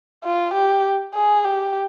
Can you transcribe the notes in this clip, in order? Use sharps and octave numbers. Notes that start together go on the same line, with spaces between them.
F4
G4
G#4
G4